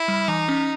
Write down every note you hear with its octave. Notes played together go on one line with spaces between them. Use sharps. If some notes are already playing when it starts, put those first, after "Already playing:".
Already playing: E4
G3
E3 D#4
C#4